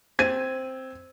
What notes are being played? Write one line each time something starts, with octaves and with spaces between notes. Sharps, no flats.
C4 G#6 D#7